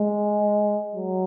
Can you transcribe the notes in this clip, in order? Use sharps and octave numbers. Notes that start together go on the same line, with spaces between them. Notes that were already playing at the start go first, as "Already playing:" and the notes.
Already playing: G#3
F#3